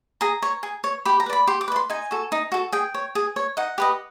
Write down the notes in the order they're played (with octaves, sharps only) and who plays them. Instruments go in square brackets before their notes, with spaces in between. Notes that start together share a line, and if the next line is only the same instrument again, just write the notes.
[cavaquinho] G#4 A#5
C#5
G#4
C#5
G4 B5
A#5
B4
D5 B5
G4 C6
D6
B4 D5
C6
D#4 G#5
F#4 A4
D#4
F#4 A4
G#4 G5
C#5
G#4
C#5
D#4 F#5
G4 B4 D#5